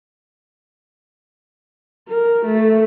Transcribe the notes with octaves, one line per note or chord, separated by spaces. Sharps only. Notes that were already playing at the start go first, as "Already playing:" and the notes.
A#4
A3